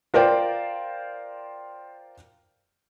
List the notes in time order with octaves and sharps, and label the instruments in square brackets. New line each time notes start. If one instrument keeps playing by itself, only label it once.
[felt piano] F4 A#4 C5 D5 G5